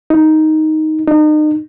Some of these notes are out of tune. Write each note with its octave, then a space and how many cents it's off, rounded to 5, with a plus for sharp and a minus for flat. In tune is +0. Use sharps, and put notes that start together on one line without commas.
D#4 +5
D#4 -35